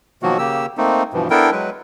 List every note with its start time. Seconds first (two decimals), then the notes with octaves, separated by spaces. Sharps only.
0.23 B2 D#3 F3 F#3 A#3 F#4
0.38 C#3 A#3 G4 E6
0.78 A3 A#3 C4 D#4
1.13 G2 B2 E3 F3
1.30 B3 D4 E4 A4 A#4 G5
1.52 F#3 G#3 B4